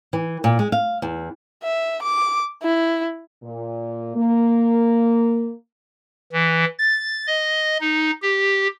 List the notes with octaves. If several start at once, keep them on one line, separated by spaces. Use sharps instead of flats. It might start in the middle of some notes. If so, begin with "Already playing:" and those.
E3
A#2
G#3
F5
E2
E5
D6
E4
A#2
A#3
E3
A6
D#5
D#4
G4